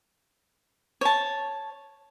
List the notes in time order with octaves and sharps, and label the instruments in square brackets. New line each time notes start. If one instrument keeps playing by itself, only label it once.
[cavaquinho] C#5 A5